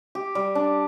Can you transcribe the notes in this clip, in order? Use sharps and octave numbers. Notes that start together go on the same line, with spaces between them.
G4
G3
D4